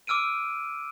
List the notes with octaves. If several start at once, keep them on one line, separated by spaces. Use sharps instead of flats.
D6 E6 F6 D7 D#7